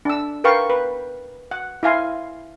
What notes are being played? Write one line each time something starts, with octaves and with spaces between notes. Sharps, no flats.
D4 E6
A#4 B4 F5 G5 C#6
B4
F#5
E4 F5 G#5 C6